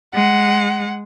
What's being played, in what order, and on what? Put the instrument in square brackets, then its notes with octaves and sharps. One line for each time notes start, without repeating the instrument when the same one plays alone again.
[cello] G#3 [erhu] F#5